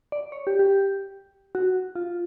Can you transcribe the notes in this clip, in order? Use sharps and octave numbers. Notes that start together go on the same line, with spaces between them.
D5
C#5
G4
G4
F#4
F4